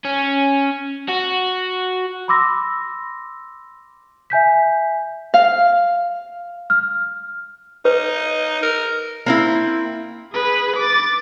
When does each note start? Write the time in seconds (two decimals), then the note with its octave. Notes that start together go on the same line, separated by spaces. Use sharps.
0.05 C#4
1.08 F#4
2.28 B5 C6 D6 E6 A#6
4.30 E5 G#5 G6 B6
5.34 F5
6.70 F6
7.85 D#4 B4
8.62 A#4
9.26 A#3 C4 E4
10.32 G#4 B4
10.76 D6 A6